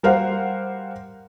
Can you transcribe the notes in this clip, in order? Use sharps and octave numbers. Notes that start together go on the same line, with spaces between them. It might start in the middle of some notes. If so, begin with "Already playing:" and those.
G3 A#4 C5 F5 F#5